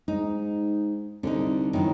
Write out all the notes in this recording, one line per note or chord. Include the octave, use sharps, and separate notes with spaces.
G#2 D#4
C2 D3 D#4
A2 D#3 E3 F#3